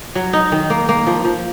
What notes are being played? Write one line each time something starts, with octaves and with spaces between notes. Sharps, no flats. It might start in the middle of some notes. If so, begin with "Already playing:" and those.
F#3
D#4
D#3
A#3
A#3
F3
F3